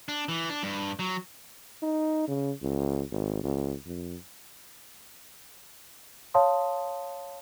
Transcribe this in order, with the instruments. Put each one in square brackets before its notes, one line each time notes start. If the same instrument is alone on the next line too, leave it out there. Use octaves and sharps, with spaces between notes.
[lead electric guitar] D4
E3
D4
G2
F#3
[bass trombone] D#4
C#3
C#2
G#1
C#2
F2
[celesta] C#5 F5 A5 C6 D#6